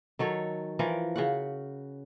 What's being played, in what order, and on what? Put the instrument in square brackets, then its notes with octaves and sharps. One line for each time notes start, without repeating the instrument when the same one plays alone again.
[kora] D#3 F#3 A4 C#5
E3 F3 A#4
C#3 F#4 F#5